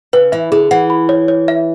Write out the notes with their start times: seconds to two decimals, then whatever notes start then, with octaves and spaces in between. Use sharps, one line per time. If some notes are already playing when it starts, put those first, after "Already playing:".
0.13 C#3 B4
0.32 E3 E5
0.52 D3 G#4
0.71 E3 F#5
0.90 B5
1.09 C#5
1.28 C#5
1.48 E5